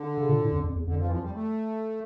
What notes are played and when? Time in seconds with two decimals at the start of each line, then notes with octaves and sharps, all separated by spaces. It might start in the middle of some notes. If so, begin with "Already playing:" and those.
Already playing: D3
0.18 C#3
0.29 A#2
0.41 A2
0.52 F2
0.64 F2
0.75 E2
0.87 F2 D3
0.99 F3
1.07 E3
1.11 F3
1.23 G3
1.34 A3